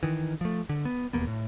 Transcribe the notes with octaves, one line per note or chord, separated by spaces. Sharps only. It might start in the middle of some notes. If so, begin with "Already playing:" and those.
D#3 E3
F3 A3
D3
B3
E1 D#2 A#3 B3
A2